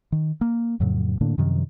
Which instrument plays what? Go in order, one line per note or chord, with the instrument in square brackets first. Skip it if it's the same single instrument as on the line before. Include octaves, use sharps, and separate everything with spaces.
[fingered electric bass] D#3
A#3
F2 A2 C#3 F#3
A2 D3 A#3 D4
F#2 C3 D#3 F3